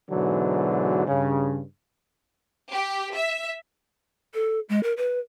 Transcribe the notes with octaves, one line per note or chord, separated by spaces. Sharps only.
G#2 B2 D3 E3 F#3
G2 C#3
G4
E5
A4
G#3
A#4
B4